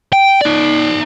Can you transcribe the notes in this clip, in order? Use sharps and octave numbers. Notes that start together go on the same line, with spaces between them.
G5
D#4 D5